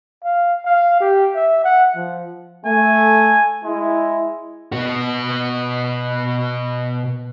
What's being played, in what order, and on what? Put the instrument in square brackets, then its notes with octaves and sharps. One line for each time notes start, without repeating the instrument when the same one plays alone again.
[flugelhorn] F5
F5
G4
E5
F#5
F3
[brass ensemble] A3 [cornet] G#5
[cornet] G#3 [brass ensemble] E4
[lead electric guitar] B2 F#4